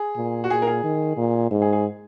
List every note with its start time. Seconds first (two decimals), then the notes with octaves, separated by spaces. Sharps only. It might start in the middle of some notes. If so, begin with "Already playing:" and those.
Already playing: G#4
0.16 A#2
0.44 F#4
0.50 A#2 G#4
0.62 A#4
0.67 G#4
0.84 D#3
1.17 A#2
1.51 G#2
1.62 G#4
1.73 G#4